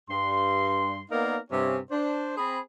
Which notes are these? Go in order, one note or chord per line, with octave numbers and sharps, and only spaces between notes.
G2 C6
A#3 B3 D#4 A#4 D5 F5
G2 C3 C#4
D4 C5
C4 G#4 B5